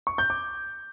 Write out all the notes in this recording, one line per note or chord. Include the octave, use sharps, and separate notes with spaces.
C#6
G6
D6